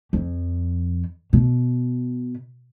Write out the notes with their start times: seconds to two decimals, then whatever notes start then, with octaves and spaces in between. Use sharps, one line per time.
0.13 F2
1.33 B2